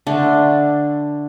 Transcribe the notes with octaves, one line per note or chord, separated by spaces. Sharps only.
D3 A3 D4